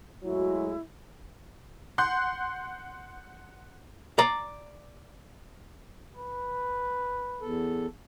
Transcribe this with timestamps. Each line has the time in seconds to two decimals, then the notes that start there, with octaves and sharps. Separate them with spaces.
0.23 A2 F#3 G#3 E4 F#4
1.98 F#5 C6 F#6 G6
4.19 D5 A#5
6.16 B4
7.41 E2 A4